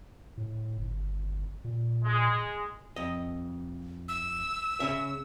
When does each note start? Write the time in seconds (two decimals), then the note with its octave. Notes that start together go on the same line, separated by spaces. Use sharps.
0.37 A2
0.78 G1
1.65 A#2
2.04 G#3
2.96 F2 D#5
4.08 E6
4.80 C#3 C#4 E5